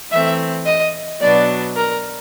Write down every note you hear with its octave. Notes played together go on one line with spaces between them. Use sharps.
E3 A3 C4 E5
D#5
B2 F#3 B3 D4 D5
A#4